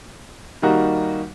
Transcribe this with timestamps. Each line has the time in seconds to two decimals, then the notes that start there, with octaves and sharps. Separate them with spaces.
0.62 D#3 G3 A#3 D#4 F#4